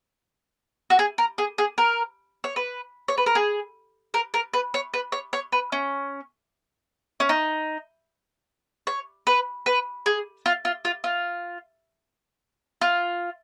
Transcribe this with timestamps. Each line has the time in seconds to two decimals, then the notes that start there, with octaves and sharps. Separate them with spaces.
0.90 F#4
0.99 G#4
1.18 A#4
1.38 G#4
1.58 G#4
1.78 A#4
2.44 C#5
2.56 B4
3.08 C#5
3.18 B4
3.26 A#4
3.35 G#4
4.14 A#4
4.34 A#4
4.53 B4
4.74 C#5
4.94 B4
5.12 C#5
5.33 C#5
5.52 B4
5.72 C#4
7.20 C#4
7.29 D#4
8.87 C#5
9.27 B4
9.66 B4
10.06 G#4
10.46 F4
10.65 F4
10.85 F4
11.04 F4
12.81 F4